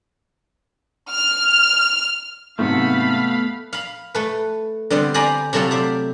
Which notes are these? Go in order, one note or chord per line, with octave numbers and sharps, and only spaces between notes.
F6
G#2 C3 F#3 A3 B3 A4 F5 B5
F5 B5
A3 B4
D3 G3 B3 C4
C5 D5 G#5 A#5 B5
C3 F#3 A3 C4 E4 F4
C5 D5 E5